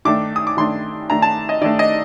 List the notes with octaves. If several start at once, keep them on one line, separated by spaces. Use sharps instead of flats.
D#3 A3 D4 D6
D#6
D6
D#3 A3 D4 C6
D#3 A3 D4 A#5
A5
D#5
D#3 A3 D4 D5
D#5